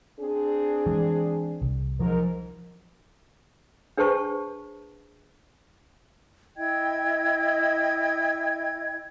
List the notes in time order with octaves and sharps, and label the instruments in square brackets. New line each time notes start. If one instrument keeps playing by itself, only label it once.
[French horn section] C4 D4 G#4
[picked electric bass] E3 G#3
C2
[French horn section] G#2 A#4 [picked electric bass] F3 F#3
[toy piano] D4 G#4 B4 C5 A5 C#6
[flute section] E4 D#5 G5 G#6